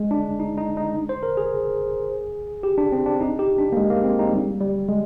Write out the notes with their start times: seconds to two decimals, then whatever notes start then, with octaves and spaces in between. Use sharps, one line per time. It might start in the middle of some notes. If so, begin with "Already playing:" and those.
Already playing: G#3
0.11 D4
0.40 D#4
0.57 D#4
0.77 D#4
1.09 C5
1.23 A#4
1.37 G#4
2.63 G4
2.78 D4
2.92 C4
3.06 D4
3.20 D#4
3.39 G4
3.58 D4
3.72 A#3
3.77 G#3
3.90 A#3
4.04 C4
4.19 D#4
4.33 G3
4.61 G3
4.89 G#3